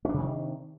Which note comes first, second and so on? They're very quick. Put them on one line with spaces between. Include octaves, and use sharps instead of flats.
C#4 D4 C3 D#3